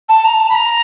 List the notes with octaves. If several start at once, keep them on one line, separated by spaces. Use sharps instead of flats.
A5
A#5
A5
B5
A#5